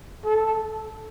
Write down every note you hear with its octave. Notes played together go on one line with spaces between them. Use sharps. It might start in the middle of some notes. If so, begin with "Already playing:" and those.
A4